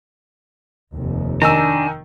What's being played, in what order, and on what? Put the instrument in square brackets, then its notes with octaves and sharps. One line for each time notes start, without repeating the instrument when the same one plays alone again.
[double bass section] F1 D#2
[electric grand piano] D#3 D#4 E6 [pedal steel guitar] D4 A#5 [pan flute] G#5